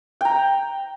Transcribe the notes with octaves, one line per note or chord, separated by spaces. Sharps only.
G5 A#5